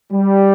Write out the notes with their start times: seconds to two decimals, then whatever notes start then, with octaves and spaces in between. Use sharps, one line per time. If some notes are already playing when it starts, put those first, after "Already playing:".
0.13 G3